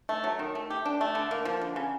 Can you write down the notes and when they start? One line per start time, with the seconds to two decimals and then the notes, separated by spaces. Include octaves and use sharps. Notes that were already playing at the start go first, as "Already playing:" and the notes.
0.09 A3
0.24 F#3
0.39 D#3
0.55 A3
0.70 G4
0.85 D4
1.01 A3
1.15 D3
1.31 A#3
1.45 F3
1.61 D3
1.76 C#3